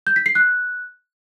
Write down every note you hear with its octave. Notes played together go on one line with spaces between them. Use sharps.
G6
B6
C7
F#6